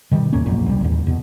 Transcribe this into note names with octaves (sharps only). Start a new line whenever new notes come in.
B2 D#3 F3 G3
D#2 A2 A#3 C#4
E1 A#1 F#2 A#2
C2 G3
A1 D#2
E2 B2